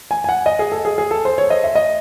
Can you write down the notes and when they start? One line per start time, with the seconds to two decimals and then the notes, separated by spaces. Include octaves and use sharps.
0.11 G#5
0.24 G#5
0.29 F#5
0.46 D#5
0.59 G#4
0.72 A4
0.85 G#4
0.98 G#4
1.11 A4
1.25 C5
1.38 C#5
1.50 D#5
1.64 E5
1.75 D#5